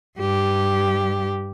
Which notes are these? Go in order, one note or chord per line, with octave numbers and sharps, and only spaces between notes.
G2 G4